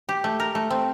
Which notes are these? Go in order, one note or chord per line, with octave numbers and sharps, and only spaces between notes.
G4
A3
A#4
A3
C4